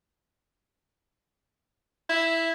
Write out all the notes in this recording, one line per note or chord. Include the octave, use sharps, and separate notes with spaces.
E4 E5